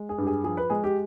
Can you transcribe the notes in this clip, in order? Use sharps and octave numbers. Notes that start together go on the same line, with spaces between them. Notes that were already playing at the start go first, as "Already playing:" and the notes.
Already playing: G#3
G#4
G2 G4
G#4
F3 G#4
B4
G#3 G#4
G4